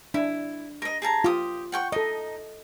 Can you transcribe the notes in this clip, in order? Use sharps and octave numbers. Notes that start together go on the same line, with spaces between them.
D4 E4
A#4 D#5
G#4 A5 A#5
F4 G4 D#6
F#5 G5 C#6
D#4 A4 D#5